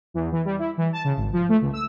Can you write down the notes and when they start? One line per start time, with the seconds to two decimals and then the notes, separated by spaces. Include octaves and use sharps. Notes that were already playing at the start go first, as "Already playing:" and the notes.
0.14 E2
0.32 E3
0.45 G3
0.59 E4
0.78 E3
0.93 A5
1.05 C#3
1.17 G#1
1.33 F3
1.49 A3
1.61 C#2
1.73 E6